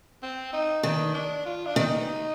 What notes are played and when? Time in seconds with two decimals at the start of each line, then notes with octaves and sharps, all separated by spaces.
0.23 C4
0.53 D#4
0.83 D#3 D4
1.14 D4
1.45 F4
1.66 D4
1.75 D#3 D#4